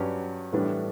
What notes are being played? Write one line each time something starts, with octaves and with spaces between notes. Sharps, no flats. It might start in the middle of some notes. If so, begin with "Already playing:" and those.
Already playing: G2 F#3 C#4 G4 B4
A2 E3 G3 B3 D4